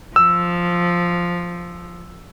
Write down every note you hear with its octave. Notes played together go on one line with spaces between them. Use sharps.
F3 E6